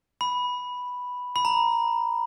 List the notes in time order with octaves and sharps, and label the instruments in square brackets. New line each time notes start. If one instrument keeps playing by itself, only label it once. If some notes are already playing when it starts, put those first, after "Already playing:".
[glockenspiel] B5
B5
A#5